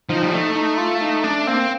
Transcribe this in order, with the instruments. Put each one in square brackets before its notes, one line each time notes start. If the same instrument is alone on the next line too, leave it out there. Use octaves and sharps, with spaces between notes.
[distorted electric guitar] F3 [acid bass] D#4
[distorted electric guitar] G3
[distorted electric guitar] A3 [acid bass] D#4
[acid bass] D#4
F4
D#4
[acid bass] A3 [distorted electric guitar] D4
[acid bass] A#3 [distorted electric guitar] C4